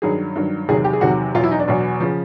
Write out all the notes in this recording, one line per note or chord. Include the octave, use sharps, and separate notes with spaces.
G2 D#3 F#3 G#4
G2 D#3 F#3
E2 C3 D#3 F#3 G#4
G4
G#4
E2 C3 D#3 F#3 F#4
E2 B2 F#3 F4
E4
D#4
D4
E2 B2 F#3
C#3 F3